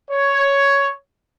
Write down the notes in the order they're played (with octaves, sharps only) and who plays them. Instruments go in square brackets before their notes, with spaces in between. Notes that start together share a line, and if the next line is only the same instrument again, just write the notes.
[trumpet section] C#5